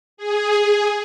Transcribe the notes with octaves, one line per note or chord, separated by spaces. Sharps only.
G#4